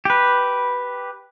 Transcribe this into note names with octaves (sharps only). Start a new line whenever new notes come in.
G4 B4